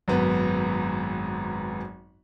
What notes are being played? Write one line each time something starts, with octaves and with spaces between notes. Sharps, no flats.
G#1 F#2 B3